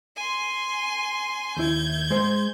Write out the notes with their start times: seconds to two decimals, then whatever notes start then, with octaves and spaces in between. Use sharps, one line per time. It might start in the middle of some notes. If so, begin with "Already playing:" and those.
0.16 G#5 C6
1.57 D#2 E4 G6 G#6
2.10 G#3 C5